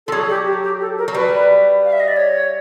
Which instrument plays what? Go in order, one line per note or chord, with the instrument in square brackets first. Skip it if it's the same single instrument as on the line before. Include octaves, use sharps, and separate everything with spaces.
[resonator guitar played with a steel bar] F3 [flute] A4
[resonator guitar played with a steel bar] F#3 [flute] G#4
[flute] G4
G4
G4
A4
A#4
[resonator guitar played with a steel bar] F#3
[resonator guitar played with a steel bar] G3 [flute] B4
[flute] F5
E5
D#5
D5
C#5